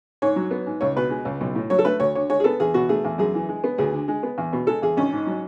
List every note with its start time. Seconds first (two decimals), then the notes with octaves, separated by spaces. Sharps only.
0.22 G#2 C#5
0.36 F#3
0.51 B3
0.66 G#2
0.81 C#2 C#5
0.96 B2 B4
1.10 G#3
1.25 C#2
1.41 B1
1.55 A2
1.70 F#3 C#5
1.79 A4
1.85 A3 B4
1.99 D2 C#5
2.15 D3 C#5
2.30 G#3 C#5
2.40 G#4
2.44 B3 A4
2.60 E2 G#4
2.74 B2 F#4
2.89 A3 G#4
3.05 E2
3.18 F#2 G#4
3.34 E3
3.49 G#3
3.64 B3
3.78 D2 G#4
3.93 D3
4.08 G#3
4.23 B3
4.38 E2
4.53 B2
4.67 G#3 A4
4.82 E2 G#4
4.97 G#1 C#4
5.13 G#2
5.27 F#3